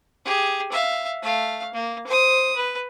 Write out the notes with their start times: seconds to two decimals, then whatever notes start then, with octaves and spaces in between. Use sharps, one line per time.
0.25 G4 G#4
0.72 E5 F5
1.22 A3 F5
1.74 A#3
2.07 C5 D#6
2.56 B4